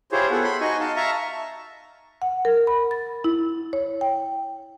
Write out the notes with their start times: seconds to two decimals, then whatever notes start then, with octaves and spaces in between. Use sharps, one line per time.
0.12 E4 F4 G4 G#4 C5 C#5
0.31 B3 G#4 A4 F#5
0.44 B5 C6
0.61 D#4 F#4 D#5 G#5 C#6
0.80 D#5 F5 A5
0.96 E5 F5 A5 A#5 C#6
2.22 F#5
2.45 A#4
2.67 B5
2.91 A6
3.24 E4
3.73 C#5
4.01 G5